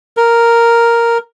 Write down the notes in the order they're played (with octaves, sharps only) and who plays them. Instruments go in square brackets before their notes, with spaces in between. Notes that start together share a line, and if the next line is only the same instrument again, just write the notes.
[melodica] A#4